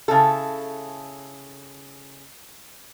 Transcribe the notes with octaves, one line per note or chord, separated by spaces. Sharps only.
C#3 E4 A4